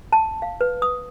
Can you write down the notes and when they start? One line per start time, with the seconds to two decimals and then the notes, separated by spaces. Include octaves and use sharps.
0.12 A5
0.42 F5
0.61 B4
0.82 D#6